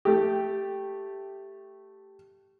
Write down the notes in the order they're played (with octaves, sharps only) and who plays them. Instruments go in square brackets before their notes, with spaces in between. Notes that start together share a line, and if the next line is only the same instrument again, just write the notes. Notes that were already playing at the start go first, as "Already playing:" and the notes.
[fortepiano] A3 G4